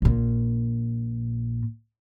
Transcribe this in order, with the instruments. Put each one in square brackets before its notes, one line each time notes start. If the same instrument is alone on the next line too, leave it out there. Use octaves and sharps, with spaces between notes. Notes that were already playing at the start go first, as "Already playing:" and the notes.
[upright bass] A#1 A#2